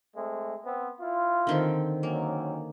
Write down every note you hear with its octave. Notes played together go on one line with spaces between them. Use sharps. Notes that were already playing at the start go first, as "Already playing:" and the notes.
G#3 A3 C4
B3 C4
E4 F4
D3 D#3 C4
D#3 F#3 A#3 C#4